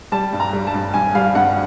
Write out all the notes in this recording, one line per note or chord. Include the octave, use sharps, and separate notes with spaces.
G3 A5
G2
A#5
G3
A5
G2
G2 G#5
G3 F5
G2 F#5